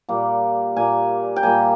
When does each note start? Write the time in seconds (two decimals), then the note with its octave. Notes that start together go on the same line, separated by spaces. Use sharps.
0.09 A#2 G3 A#3
0.76 A#2 G3 A#3 G#5
1.36 G5
1.43 A#2 G3 A#3 G#5